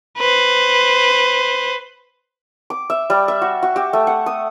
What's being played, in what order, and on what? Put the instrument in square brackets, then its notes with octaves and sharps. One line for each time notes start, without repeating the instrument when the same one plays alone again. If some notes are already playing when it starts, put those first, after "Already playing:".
[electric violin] B4 C5
[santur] D6
E5
G3
E5
F#4
F#4
G4
A3
F#5
D#6